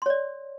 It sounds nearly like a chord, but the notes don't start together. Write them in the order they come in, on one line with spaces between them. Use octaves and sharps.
C6 C#5 D5